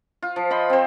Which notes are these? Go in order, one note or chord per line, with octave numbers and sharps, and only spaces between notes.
F4
F3
C5 D#5 B5
C4 C5